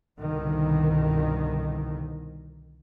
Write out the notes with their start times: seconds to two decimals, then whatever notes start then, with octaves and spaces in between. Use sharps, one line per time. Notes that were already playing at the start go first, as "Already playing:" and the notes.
0.19 C2 G2 B2 D3 D#3